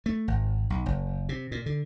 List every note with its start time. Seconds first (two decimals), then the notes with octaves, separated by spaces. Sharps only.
0.06 A3
0.28 G#1
0.70 B1
0.86 F#1
1.29 C3
1.52 A#2
1.66 D3